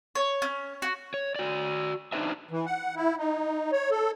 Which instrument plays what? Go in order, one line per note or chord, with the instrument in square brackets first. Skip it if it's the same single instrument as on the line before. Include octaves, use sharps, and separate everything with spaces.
[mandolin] C#5
C#4
F#4
[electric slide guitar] C#5
F#4 D5
D4 D#4 B4 C5 E5
[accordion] E3
F#5
E4
D#4
C#5
A4